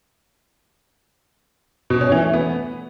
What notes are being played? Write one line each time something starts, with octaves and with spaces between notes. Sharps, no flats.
B2
C#4
E3
A3
B3